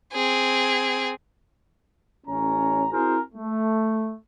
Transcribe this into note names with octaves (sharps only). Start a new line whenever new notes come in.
C4 G#4
A1 C#4 A#5
C4 E4 F#4 G#4 A#4 C5
A3